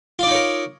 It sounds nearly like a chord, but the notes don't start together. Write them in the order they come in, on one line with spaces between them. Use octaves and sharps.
F4 D5 D#4 C#5 A#4